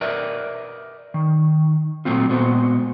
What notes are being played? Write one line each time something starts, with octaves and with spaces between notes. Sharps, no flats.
A#4 B4 D5 E5
D#3
A#2 E3 F#3 A3 C4 F4
A#2 G#3 B3 F#4 C5